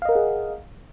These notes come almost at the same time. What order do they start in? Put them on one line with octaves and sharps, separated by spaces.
F5 D#5 A#4 F#5 G#4